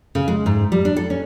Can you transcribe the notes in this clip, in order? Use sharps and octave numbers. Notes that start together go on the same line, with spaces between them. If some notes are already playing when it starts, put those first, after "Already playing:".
C#3
G#3
G#2
G3
D4
A4
C#4